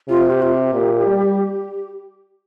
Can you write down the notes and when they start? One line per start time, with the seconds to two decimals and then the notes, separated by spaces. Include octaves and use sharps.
0.09 C3 F4
0.30 G4
0.42 F4
0.52 G4
0.73 A#2
1.07 G3